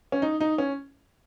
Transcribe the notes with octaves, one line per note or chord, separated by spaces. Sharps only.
C#4
D#4
D#4
C#4